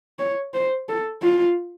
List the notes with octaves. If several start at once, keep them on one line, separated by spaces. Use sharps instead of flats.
C#5
C5
A4
F4